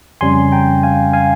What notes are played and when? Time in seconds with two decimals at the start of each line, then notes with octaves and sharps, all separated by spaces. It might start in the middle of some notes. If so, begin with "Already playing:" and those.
0.21 F2 C#3 G3 C#4 G#5 C6
0.52 G5 A#5
0.83 F5 G#5
1.13 F5 G#5